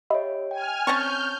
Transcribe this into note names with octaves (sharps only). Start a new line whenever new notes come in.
G4 C#5 D#5 E5 B5
G5 G#5 F6
C4 C#4 A5 C#6 F6 G6